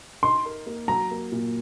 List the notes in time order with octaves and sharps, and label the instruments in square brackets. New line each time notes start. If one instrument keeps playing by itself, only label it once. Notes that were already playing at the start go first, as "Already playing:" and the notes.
[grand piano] D#4 [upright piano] C6
[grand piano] A#4
A#3
[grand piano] F#3 [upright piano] A#5
[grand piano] A#3
A#2